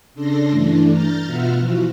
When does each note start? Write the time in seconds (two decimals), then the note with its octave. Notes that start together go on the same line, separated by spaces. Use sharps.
0.14 C#3 D4 A4 C6 A#6
0.50 G2 E3 A3 D4
0.90 A#5 F6 G6 A6
1.25 B2 B3 F4 E5 F#5 F6
1.59 E3 F3 F#4